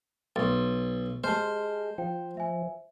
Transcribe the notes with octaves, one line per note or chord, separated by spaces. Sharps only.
B1 A6
G#3 G4 C5 A5 F6
F3 G5
E5 G#5